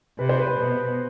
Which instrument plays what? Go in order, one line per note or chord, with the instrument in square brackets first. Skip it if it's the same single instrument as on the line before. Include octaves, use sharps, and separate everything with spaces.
[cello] C3 [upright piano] B4
[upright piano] C5
B4
[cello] B2